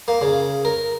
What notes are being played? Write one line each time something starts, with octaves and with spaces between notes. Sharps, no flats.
A#3
C#3
A#4